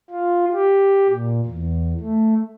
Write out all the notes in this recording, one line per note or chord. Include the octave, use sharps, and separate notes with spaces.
F4
G4
A#2
E2
A3